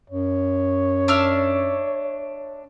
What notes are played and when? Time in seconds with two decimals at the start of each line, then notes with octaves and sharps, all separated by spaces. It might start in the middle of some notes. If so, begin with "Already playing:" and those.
0.10 F#2 C#5
1.08 D4 E5 F6